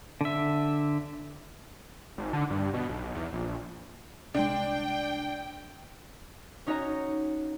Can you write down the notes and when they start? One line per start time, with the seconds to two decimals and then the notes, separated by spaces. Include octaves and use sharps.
0.21 D3 E5
2.18 G#1
2.33 D3
2.50 G2
2.74 B2
2.89 B1
3.15 E2
3.33 A#1
4.35 C2 G#3 D4 G5
6.66 C#4 D#4 F#4 C#5 D#5 A#5